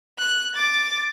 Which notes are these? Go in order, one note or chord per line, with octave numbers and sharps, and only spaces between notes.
F#6
D6 A6